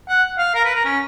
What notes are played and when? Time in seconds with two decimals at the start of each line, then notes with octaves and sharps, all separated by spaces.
0.09 F#5
0.38 F5
0.55 A#4
0.65 B4
0.75 A#4
0.85 C#4